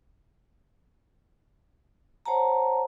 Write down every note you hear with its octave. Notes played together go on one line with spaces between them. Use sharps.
C5 C#5 F#5 A5 A#5